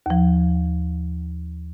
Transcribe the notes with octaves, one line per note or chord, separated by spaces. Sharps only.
D#2 F3